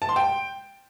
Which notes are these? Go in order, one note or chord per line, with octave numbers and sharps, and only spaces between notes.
A5
C6
G5